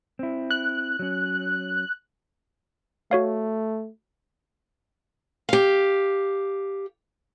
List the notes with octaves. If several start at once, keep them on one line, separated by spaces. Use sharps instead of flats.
C4 E4
F#6
F#3 C#4
A3 F#4 C#5 F5
G4 F5